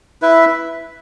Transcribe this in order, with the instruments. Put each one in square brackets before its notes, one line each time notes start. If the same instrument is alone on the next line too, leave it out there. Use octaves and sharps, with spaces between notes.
[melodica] E4 B4 E5